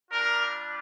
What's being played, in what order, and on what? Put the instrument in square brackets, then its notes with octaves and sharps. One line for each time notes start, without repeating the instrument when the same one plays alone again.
[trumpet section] G3 D4 F4 A#4